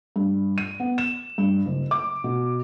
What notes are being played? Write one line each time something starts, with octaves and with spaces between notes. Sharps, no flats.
G2
D#7
B3
E7
G2
F#1
D6
B2